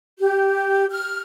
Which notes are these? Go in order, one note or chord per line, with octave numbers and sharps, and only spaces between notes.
G4
F6